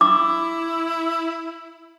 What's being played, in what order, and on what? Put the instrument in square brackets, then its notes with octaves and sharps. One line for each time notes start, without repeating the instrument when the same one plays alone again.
[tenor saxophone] E4 [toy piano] D6